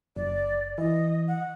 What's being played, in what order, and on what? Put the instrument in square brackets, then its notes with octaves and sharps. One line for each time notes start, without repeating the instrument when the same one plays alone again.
[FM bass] F#1 [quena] D5
[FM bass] E3 [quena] D#5
[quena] F#5